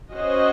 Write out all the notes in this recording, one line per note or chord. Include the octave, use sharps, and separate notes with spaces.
C#4 F#4 C5 D#5